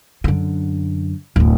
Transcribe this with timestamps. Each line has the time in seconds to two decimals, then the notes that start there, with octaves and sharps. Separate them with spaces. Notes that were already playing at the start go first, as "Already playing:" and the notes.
0.24 F#2 D3
1.36 D1 F#2